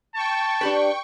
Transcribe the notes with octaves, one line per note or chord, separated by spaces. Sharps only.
G5 A5 C#6
D4 G4 B4